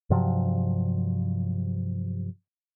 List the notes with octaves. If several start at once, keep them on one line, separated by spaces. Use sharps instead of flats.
G2 C3 F3 F#3